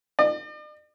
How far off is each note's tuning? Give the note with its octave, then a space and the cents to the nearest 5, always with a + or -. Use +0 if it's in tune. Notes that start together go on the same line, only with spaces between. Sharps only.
D5 +45